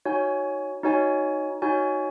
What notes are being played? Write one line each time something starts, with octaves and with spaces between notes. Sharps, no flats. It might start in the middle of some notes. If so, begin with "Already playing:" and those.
D#4 F#4 C#5 G#5
D#4 F#4 C#5 G#5
D#4 F#4 C#5 G#5